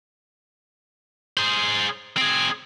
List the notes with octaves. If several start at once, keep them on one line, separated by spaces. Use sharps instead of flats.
G#4 C5
C4 G#4